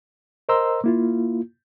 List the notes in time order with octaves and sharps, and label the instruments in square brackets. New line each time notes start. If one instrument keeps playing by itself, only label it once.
[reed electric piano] A#4 C5 D#5 A#5 C6 E6
A#3 E4 F4